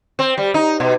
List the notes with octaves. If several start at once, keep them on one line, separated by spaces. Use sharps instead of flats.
C4
G3
D#4
B2